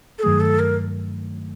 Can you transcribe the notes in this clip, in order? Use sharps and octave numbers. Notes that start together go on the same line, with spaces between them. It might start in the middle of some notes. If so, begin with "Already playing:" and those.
A4
G2 D#3 F#3 A3 G#4
A4
A#4